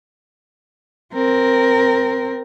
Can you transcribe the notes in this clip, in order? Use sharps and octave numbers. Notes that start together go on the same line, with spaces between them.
C4 A#4